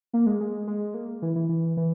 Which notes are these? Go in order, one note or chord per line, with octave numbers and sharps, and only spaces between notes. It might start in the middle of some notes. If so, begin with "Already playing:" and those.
A#3
G#3
G#3
G#3
A#3
E3
E3
E3
E3